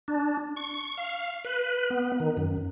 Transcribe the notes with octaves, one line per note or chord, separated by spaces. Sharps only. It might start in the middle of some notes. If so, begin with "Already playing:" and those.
D4
C#6
F5
B4
B3
D#3
F#2